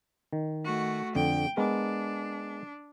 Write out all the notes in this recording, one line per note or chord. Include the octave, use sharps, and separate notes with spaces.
D#3
A3 F#4
F2 D3 G5
G#3 B3 D4 A#4